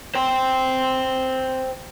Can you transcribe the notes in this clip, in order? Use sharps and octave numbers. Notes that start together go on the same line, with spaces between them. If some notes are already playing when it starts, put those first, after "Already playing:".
C5 G5